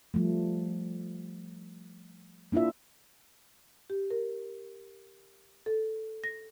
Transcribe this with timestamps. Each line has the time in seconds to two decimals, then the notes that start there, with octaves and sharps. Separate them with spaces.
0.14 F3 G3 A3
2.52 A#3 D4 E4 F4 E5
3.90 G4
4.11 A#4
5.66 A4
6.24 A#6